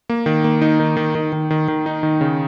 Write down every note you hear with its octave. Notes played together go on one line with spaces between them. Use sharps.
A#3
D#3
A#3
D#4
D#3
D#3
D#3
D#3
D#3
D#3
D#4
D#3
C#3